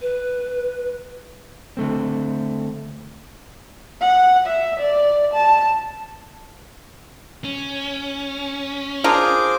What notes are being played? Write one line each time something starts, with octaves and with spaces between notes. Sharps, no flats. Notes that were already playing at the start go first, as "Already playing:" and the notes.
B4
D3 A3 C4
F#5
E5
D5
A5
C#4
D4 F4 G#4 A#4 C5 D6